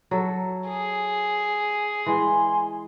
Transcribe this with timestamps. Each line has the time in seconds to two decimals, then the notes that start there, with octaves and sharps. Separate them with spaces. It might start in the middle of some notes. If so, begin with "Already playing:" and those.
0.11 F#3 A4
0.68 G#4
2.06 E3 G#3 G#5 C6